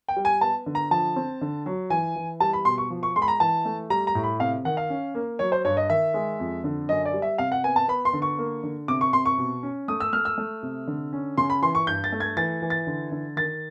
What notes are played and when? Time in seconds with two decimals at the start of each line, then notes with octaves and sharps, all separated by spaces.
0.08 G5
0.17 G3
0.25 G#5
0.41 B3 A5
0.66 D3
0.75 A#5
0.91 F3 A5
1.16 C4
1.41 D3
1.66 F#3
1.90 E3 G#5
2.16 E3
2.40 G3 A5
2.53 B5
2.65 B2 C6
2.78 C#6
2.90 F3
3.03 C#6
3.16 G#3 C6
3.22 B5
3.28 A#5
3.40 E3 A5
3.65 A3
3.90 G3 A#5
4.07 A#5
4.15 A2
4.24 B5
4.40 C3 F5
4.65 D#3 F#5
4.77 F5
4.90 C#4
5.15 A#3
5.39 F#3 C#5
5.52 C5
5.65 G2 C#5
5.77 D#5
5.90 D#3 E5
6.14 G#3
6.40 F2
6.64 D3
6.89 F#2 D#5
7.05 D5
7.14 G3
7.22 E5
7.38 C3 F5
7.52 F#5
7.64 B3 G#5
7.76 A5
7.88 B3 B5
8.05 C6
8.13 D3
8.22 C#6
8.38 A#3
8.63 D3
8.88 C3 D6
9.01 C#6
9.13 C3 C6
9.25 C#6
9.38 B2
9.63 C#4
9.88 A3 D#6
10.00 E6
10.13 A3 F6
10.25 E6
10.38 A3
10.63 C3
10.87 D3
11.13 C#4
11.38 C#3 C6
11.50 B5
11.62 E3 C6
11.75 C#6
11.87 G2 G6
12.04 A6
12.12 A3
12.20 G#6
12.37 E3 A6
12.62 E3
12.70 A6
12.87 D3
13.12 D3
13.36 D#3 A6